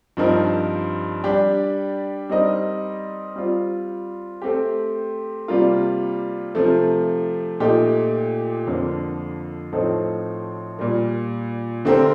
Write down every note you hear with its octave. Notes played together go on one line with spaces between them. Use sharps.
G2 F3 C4 D#4 A#4
G3 D4 G4
G3 C4 D#4 A#4 D#5
G3 C4 F4
A3 C4 G4
C3 G3 A#3 F4
C3 F3 A3
A#2 A3 D#4 G4
F2 D3 F3 A#3
A2 F3 C4 D#4 A4
A#2 G3 A#3
D3 A3 C4 G4 A#4